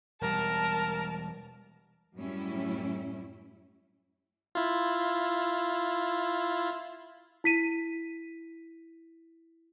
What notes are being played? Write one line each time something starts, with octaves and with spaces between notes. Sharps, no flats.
E1 G3 A#4 A5
F#2 A2 G3 C#4 E4
E4 F4
E4 B6 D#7